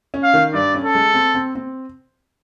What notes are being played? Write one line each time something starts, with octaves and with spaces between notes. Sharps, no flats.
C#4
F5
D#3
G2 D5
C#4
A4
G#3
C4
C4
C4